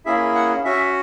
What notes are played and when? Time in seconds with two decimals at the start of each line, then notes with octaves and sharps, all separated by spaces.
0.05 A#3 C#4 E4 G#4 E5
0.35 F#5
0.64 C#4 F#4 E5